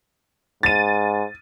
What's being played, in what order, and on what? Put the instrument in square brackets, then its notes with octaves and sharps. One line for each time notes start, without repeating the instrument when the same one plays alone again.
[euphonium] G#2 [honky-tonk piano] A6 D#7